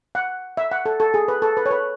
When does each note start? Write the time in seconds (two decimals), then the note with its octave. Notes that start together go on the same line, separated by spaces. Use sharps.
0.15 F#5
0.57 E5
0.71 F#5
0.86 A4
1.00 A4
1.14 G#4
1.28 B4
1.42 A4
1.57 B4
1.66 C#5
1.71 B4